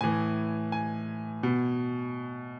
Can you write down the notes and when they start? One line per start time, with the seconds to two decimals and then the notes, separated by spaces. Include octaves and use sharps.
0.01 A2 E3 G#5
0.72 G#5
1.43 B2